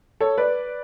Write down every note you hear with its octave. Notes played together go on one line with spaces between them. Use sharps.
A4 C#5
B4 D5